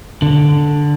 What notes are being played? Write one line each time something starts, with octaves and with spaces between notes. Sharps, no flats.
D3